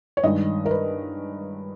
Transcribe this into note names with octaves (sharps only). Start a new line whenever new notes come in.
C#5
G2 D#3 G#3 D#5
A#4
B4